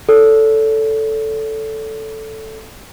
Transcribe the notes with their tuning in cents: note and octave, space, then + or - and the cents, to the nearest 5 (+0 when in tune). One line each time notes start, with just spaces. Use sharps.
A4 +0 C#5 +45